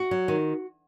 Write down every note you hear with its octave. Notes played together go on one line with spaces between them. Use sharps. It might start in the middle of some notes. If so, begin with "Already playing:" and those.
Already playing: F#4
F#3
D#3